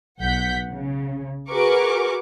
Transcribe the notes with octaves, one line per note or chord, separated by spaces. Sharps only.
B1 F#5 G6 B6
C#3
F#4 G#4 A#4 B4 C#6 D6